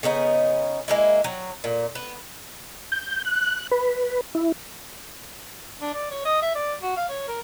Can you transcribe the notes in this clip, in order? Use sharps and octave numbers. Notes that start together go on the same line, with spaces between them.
C#3 B3 D#4 G#4
G#3 A#3 E4
F#3
A#2
B3
G6
F#6
B4
E4
D4
D5
C#5
D#5
E5
D5
F#4
F5
C#5
A#4